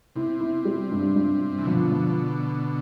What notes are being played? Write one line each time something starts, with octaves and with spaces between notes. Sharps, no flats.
C3 E4
E4
G3
G2
G2
G2
E3
B2 D3 F3
F3